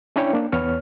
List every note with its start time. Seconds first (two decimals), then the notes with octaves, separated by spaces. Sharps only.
0.16 C#4 D4 E4 C#5 G5
0.33 A#3 D4
0.52 E2 B3 C#5 F6